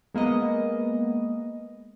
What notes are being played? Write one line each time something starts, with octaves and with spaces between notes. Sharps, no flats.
G#3 A#3 B3 D#5